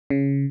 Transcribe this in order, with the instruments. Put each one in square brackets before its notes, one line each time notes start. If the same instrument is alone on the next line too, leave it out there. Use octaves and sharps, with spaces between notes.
[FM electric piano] C#3